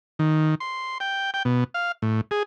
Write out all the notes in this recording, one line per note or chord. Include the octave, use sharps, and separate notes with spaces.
D#3
C6
G5
G5
B2
F5
A2
G#4